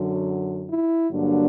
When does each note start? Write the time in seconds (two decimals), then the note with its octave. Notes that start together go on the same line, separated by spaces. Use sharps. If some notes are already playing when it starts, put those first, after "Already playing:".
Already playing: F#2 D3 F#3
0.68 E4
1.11 G2 D3 F#3 A#3 D4